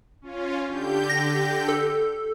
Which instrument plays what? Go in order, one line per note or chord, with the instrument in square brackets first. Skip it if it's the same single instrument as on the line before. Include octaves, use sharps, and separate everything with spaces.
[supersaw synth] C#4 F4
D3 G4 G6
[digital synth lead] A#6
A4